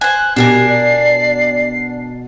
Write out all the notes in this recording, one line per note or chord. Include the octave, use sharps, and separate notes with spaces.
C5 G#5 F#6
B2 D4 G4 A#4 G#5 C7
D5